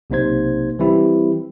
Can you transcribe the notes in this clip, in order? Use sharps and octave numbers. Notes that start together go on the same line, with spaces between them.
B1 C3 A#3 D#4 C5 G#6
E3 G3 C4 E4 G4